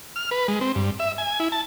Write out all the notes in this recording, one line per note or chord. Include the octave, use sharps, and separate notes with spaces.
F6
B4
G#3
C4
G2
E5
G#5
E4
A5